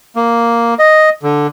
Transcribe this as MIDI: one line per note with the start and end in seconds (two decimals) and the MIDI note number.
0.16 0.74 58
0.79 1.09 75
1.23 1.47 50